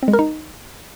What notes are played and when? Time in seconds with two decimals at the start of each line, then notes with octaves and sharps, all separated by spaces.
0.03 C4
0.08 G#3
0.13 A#4
0.19 D#4